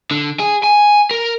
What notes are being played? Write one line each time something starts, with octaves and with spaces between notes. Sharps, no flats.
D3
G#4
G#5
A#4